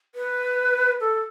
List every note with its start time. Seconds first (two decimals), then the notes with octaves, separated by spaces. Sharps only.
0.15 B4
1.01 A4